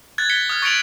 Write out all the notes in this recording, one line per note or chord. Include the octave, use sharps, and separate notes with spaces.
F#6 G#6 A6
A6 B6 C#7 G7
D#6 F6
C#6 A6 C#7 D7 F7 F#7